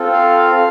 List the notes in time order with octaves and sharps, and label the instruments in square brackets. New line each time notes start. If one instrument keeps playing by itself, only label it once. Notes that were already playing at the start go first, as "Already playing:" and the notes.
Already playing: [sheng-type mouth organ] C4 F4 A4
F5